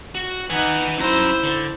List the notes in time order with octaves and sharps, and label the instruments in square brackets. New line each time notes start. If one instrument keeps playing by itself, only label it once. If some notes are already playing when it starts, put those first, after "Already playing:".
[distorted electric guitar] F#4
[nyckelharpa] D#4 F#5 [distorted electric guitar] B4 G#5
[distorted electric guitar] F#2 A#5 [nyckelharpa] E4 C5
[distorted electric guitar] D3